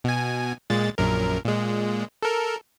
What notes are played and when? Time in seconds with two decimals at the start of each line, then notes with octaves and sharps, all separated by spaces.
0.04 B2 G#5
0.70 A#2 G#3 A6
0.98 A#1 F#2 A#4
1.45 A#2 G#3
2.23 A4 A#4